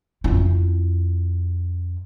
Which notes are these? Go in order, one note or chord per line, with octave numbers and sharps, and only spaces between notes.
F2 E4